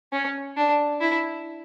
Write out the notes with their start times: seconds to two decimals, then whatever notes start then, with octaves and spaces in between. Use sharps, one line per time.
0.13 C#4
0.57 D4
1.01 E4